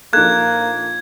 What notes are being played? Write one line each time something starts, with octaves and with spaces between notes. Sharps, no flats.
A#1 A#3 D#4 A4 F#6 G#6